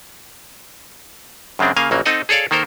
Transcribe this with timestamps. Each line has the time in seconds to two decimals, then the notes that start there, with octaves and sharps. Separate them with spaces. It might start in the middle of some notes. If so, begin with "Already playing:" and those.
1.59 F#2 C#3 G#3 C4 D4
1.77 C#3 A#3 F5 G#5
1.91 A#1 C#3 F#3 A#3
2.06 C4 D#4 A4 D#5 F#5
2.29 G#4 A4 C#5 D5 F5
2.51 D#3 A#3 A4 A#4 C5